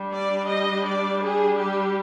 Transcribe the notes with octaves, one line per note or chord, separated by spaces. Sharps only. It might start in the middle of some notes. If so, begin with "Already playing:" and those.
Already playing: G3 D4
D5
D#5
D5
G#4
G4